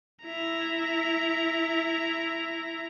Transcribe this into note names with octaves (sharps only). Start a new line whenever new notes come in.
E4 A#5